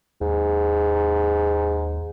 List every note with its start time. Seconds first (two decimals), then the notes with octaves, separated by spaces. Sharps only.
0.21 D#2 G#2